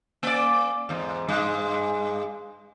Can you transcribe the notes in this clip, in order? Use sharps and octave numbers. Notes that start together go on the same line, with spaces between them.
A#3 D5
E2 G#2
G2 G#3